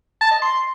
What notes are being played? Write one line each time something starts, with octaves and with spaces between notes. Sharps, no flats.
A5
D#5
C6